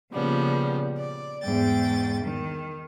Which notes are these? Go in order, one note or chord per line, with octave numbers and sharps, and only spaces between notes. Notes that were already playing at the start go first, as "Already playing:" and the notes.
A#2 C#3 F3 G3 B3
D5
E2 G#2 G5 A6
D#3